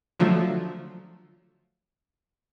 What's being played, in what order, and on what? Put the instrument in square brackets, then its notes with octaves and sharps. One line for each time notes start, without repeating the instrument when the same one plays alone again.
[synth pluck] D3 F3 F#3 A3